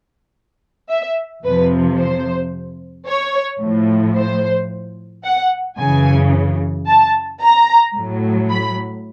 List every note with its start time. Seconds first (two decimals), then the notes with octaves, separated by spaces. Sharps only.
0.89 E5
1.43 F2 C3 F3 B4
1.98 C5
3.06 C#5
3.61 A2 F3
4.15 C5
5.24 F#5
5.78 F#2 C#3 E3 G#5
6.87 A5
7.41 A#5
7.95 A2 F#3
8.50 B5